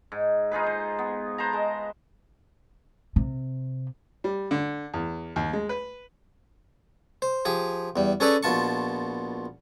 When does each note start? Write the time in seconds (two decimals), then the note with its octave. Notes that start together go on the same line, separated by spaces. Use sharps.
0.12 G#2
0.51 D#4 F4 G#4 B4
0.67 C5
0.99 B3
1.38 B4 C5 A5 A#5
1.53 G#3
3.16 C3
4.24 G3
4.51 D3
4.94 E2
5.36 D#2
5.53 G#3
5.69 B4
7.22 C5
7.45 F3 G4 G#4
7.96 E2 G3
8.20 C#4 G#4 A4 B4 C#5 D5
8.43 A#1 B2 F4 A5 C#6